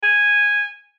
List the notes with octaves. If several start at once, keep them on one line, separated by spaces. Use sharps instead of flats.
G#5